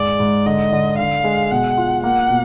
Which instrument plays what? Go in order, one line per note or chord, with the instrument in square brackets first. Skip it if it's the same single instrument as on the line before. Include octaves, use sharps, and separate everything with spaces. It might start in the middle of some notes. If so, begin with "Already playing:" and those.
Already playing: [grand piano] G#2 G#4 [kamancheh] D5
[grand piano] G#2
[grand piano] D3 [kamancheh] D#5
[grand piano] D3
[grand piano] D3 [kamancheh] F5
[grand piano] G#3
[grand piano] B2 [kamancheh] F#5
[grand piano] F4
[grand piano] A#3 [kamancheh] F#5
[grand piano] B2